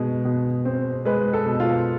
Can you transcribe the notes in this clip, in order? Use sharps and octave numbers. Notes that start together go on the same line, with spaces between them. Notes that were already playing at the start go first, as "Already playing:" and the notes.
Already playing: B2 G#3
B2
C4
G#3 B4
A4
B2
F4